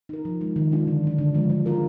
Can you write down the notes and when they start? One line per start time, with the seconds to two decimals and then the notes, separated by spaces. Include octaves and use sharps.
0.09 D#4 A#4
0.25 F3
0.41 G#3 D#4
0.56 D#3
0.71 G#3 D4 F4
0.87 D3
1.03 F#3 D4
1.18 D3
1.35 F3 G#3
1.50 F#3
1.66 D4 F4 A#4